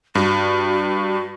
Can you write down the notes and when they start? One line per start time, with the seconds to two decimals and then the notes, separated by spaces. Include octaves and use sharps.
0.15 G2 F#4